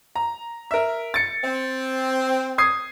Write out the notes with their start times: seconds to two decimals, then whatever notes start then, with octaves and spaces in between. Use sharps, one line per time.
0.16 A#5
0.71 A#4 E5
1.14 A6 C#7
1.44 C4
2.58 D#6 G#6 C7